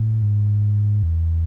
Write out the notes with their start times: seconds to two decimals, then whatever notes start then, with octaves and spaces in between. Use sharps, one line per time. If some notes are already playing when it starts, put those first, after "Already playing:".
Already playing: A2
0.22 G#2
1.03 E2